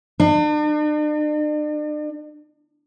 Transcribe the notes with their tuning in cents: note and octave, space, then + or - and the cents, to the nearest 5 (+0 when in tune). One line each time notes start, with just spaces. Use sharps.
D4 +45